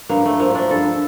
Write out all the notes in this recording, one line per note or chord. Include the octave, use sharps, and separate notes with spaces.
G2 A#3
G2 A3
F3 A#3
F3 D4
G2 A4